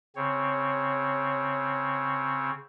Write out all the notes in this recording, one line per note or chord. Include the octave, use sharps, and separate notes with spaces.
C#3 C4 C#5